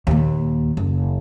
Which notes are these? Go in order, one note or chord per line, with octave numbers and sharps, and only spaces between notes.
D#2 A#2
F#1